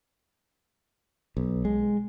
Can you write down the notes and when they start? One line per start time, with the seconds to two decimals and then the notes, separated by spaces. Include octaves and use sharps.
1.37 B1
1.65 G#3